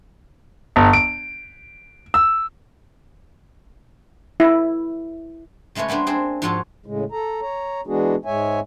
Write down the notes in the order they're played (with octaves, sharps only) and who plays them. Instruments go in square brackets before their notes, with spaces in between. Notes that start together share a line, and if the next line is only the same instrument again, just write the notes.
[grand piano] G1
D7
E6
[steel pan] E4
[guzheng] C#3 G#3 A3 B4 C#5
G3 A#3 B3 D4 C5
C4 D4 G#4 C5
G#2 F3 F4 F#4 A4 C#5
[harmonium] A2 C#3 G#3
A4 A#5
C#5 A#5
E3 G#3 B3 D4 F#4 G#4
G#2 G#3 C#5 E5 G#5